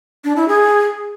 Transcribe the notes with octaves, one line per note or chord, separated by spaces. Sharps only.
D4
E4
G#4